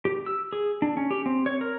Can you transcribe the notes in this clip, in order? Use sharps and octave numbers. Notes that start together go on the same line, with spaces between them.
G4
E6
G#4
D4
C#4
G4
C4
C#5
A#4